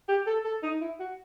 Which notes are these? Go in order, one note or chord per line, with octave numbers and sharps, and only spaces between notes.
G4
A4
A4
D#4
E4
F#4